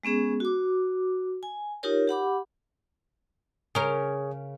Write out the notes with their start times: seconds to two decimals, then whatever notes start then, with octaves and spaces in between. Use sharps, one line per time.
0.03 G#3 B3 C#4 G#4
0.40 F#4 D6
1.43 G#5
1.83 D#4 F4 G4 A#4 C#5
2.07 G4 F#5 B5 D6
3.75 C#3 G#4 A#4 C#5